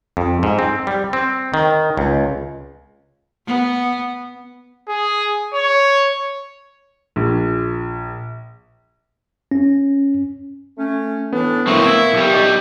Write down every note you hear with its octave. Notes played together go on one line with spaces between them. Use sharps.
F2
G#2
C4
G3
C4
D#3
C#2
B3
G#4
C#5
A#1
C#4
A3 C#4
A2 E3 B3 D4
A2 A#3 C4 E5 C#6
E4
B1 G3
D#5 C#6 D6